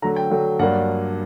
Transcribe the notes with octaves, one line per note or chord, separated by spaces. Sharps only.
D3 F#3 A3 A#5
G5
D3 F#3 A3
G2 F#3 A#3 D4 F#5